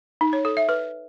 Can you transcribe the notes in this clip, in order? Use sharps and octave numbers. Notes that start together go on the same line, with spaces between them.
D#4
C#5
A4
E5
B4